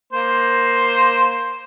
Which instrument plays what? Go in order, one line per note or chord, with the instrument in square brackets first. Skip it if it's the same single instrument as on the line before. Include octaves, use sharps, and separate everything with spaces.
[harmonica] A#3 C5